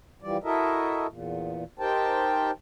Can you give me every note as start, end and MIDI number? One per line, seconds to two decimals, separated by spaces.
0.22 0.37 52
0.22 0.37 53
0.22 0.37 55
0.22 0.37 74
0.44 1.07 64
0.44 1.07 66
0.44 1.07 69
0.44 1.07 70
0.44 1.07 75
0.44 1.07 76
1.07 1.64 40
1.07 1.64 46
1.79 2.51 63
1.79 2.51 67
1.79 2.51 70
1.79 2.51 72
1.79 2.51 79
1.79 2.51 81